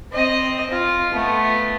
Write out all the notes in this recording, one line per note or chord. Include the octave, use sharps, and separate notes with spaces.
C4 D#5
F4
A3 B3